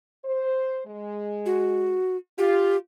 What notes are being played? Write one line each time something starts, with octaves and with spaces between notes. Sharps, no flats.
C5
G#3
F#4
F4 G4